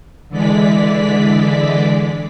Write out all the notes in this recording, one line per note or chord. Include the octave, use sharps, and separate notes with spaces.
D3 E3 G#3 D5 B6